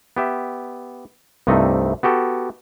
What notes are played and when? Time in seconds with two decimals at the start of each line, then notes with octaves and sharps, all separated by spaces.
0.17 B3 G4 E5
1.47 C2 G2 C3 A3 D#4 D#5
2.03 B3 F#4 G4 A4